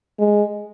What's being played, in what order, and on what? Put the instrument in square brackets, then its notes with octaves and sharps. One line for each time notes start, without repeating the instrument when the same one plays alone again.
[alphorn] G#3